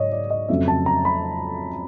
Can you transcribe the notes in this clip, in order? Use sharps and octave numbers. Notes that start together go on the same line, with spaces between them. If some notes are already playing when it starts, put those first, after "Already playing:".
Already playing: G#2 F#3 C#5 D#5
D5
D#5
F2 C#3 F#3 A3 E5
A5
A#5
B5